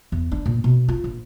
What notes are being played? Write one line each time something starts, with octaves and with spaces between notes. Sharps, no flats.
E2
D4
A#2
B2
F4
A#1